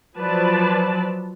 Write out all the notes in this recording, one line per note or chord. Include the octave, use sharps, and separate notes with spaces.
F3 F#3 B4 D5 A5